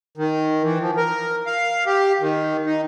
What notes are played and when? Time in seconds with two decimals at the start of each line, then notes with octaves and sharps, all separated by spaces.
0.17 D#3
0.63 E3
0.81 F3
0.97 A#4
1.46 F5
1.86 G4
2.21 D#3
2.66 D#4